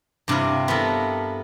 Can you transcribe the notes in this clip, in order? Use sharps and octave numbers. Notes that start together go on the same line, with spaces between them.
G2 C3 E4 F5
B3 E4 F4 A4 A#4